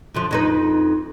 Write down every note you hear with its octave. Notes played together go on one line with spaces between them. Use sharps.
F#2 D3 F3
F2 D#4 B4